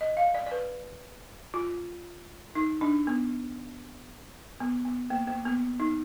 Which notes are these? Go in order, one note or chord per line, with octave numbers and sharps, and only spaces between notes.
D#5
F5
D5
D5
B4
F4
D#4
D4
B3
B3
B3
A#3
A#3
B3
D#4